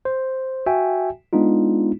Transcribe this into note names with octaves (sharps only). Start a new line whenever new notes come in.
C5
F#4 E5 G5 G#5
G#3 B3 D4 D#4 F4